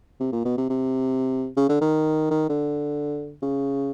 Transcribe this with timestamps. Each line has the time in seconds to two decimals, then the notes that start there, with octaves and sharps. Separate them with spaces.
0.20 C3
0.33 A#2
0.45 B2
0.58 C3
0.69 C3
1.57 C#3
1.69 D3
1.81 D#3
2.31 D#3
2.49 D3
3.42 C#3